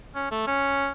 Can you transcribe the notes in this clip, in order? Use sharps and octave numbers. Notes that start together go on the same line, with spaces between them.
C#4
A3
C#4